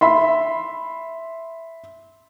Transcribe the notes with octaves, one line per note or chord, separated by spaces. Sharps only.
E5 B5 C6